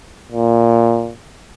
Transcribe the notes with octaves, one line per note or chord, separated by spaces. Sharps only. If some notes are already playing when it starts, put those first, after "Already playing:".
A#2